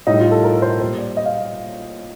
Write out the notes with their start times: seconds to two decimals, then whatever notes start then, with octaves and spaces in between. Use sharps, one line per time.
0.07 A2 G3 D#4
0.20 F4
0.31 A4
0.44 A#4
0.62 C5
0.80 A#2 G3 C5
0.98 D5
1.17 D#5
1.25 F5